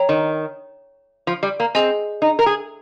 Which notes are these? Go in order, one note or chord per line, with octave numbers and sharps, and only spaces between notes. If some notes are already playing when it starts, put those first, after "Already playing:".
Already playing: C#5 G5 A#5
D#3
F3
G3
A#3
C4 G#4 D#5 G#5
D#4
A#4
G#4